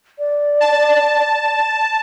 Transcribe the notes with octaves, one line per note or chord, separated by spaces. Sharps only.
D5
A5